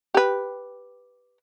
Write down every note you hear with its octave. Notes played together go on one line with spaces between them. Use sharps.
G4 B4